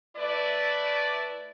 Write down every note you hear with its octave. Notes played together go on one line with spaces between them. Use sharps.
A3 E4 B4 D5